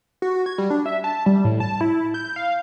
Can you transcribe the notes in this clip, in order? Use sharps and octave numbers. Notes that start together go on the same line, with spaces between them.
F#4
G#6
G3
D4
E5
A5
G3
A2
A5
E4
G6
F5